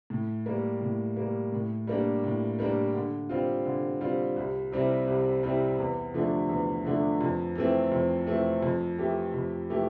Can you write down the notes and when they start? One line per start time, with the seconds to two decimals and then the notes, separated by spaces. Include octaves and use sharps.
0.10 A2
0.46 G3 A#3
0.81 A2
1.17 G3 A#3
1.53 A2
1.87 G3 A#3 D4
2.24 A2
2.59 G3 A#3 D4
2.94 D3
3.29 G3 C4 F4
3.65 D3
4.01 G3 C4 F4
4.36 C2
4.72 C3 G3 C4 E4
5.07 C2
5.43 C3 G3 C4 E4
5.79 E2
6.14 D3 F3 A3 D4
6.49 E2
6.85 D3 F3 A3 D4
7.21 F2
7.55 E3 A3 C4
7.92 F2
8.27 E3 A3 C4
8.63 F2
8.98 E3 A3 E4 G4
9.34 F2
9.69 E3 A3 E4 G4